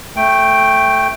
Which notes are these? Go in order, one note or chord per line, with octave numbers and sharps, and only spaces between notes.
A3 G5